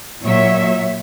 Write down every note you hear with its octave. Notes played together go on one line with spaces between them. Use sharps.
A#2 F#3 C#5 E5